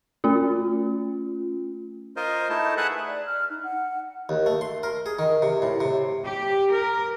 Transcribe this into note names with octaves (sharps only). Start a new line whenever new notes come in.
A3 C#4 F4
F4 A#4 C5 D#5
A3 D#4 E4 A5
G#4 B4 E5 F#5 A5 F#6
D5
F6
D#4
F#5
D#2
A3
C6
A#4
G#4
D#3
C3
A2
C3
G4
A#4